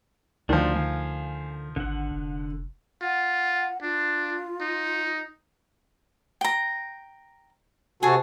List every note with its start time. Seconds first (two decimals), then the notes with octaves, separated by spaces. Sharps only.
0.49 D2 D3 D#3 F3 D4 F4 F#4
0.76 D3 F5 G#5
1.76 G#1 D3 F#5
2.11 F1
3.02 F4 F#5
3.82 D4 F4
4.61 D#4
6.41 G5 A#5
8.03 C3 F#4 G#4 A4 G#5